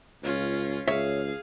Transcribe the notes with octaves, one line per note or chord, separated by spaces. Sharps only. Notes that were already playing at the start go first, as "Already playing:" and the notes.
C#2 C#4 F4
C#2 G#4 C#5 E5 F5